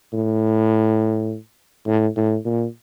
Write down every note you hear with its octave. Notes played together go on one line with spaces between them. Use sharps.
A2
A2
A2
A#2